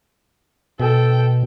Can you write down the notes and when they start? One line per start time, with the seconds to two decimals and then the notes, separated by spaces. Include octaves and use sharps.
0.80 B2 A4 G5